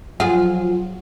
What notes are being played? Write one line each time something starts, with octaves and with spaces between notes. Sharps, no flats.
F3 F#3 F4 G#4 F#5